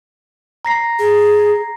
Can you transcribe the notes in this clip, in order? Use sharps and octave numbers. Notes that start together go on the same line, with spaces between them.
A#5 A#6 C7
G#4